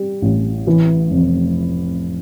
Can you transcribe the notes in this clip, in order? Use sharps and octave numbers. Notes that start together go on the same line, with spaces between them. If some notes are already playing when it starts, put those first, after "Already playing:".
Already playing: G3
A1
E3
F1